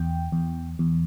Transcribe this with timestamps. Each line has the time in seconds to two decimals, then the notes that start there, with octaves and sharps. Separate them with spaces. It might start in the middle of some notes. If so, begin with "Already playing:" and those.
Already playing: E2 G5
0.32 E2
0.79 E2